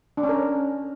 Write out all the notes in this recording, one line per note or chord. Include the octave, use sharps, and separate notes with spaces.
D4
C#4
A#4